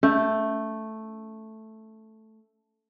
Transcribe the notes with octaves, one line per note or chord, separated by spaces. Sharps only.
A3 C#4